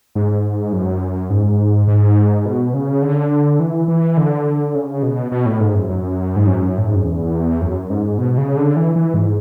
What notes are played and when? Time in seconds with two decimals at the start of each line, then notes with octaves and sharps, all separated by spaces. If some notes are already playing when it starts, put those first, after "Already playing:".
0.15 G#2
0.73 F#2
1.30 G#2
1.88 G#2
2.45 B2
2.74 C#3
3.02 D3
3.60 E3
3.88 E3
4.17 D3
4.75 C#3
5.02 B2
5.32 B2
5.46 A2
5.60 G#2
5.75 F#2
5.89 F#2
6.36 G#2
6.47 F#2
6.78 A2
6.86 G#2
6.95 F#2
7.04 E2
7.61 F#2
7.90 G#2
8.18 B2
8.38 C#3
8.57 D3
8.76 E3
8.96 E3
9.14 G#2